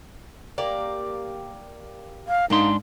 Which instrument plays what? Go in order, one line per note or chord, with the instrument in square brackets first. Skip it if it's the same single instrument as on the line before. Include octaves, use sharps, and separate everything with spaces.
[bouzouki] A#3 G4 D5
[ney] F5
[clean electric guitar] G#2 D4 C6 [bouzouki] A#3 [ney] D#4